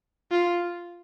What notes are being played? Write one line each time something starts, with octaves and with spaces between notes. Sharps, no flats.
F4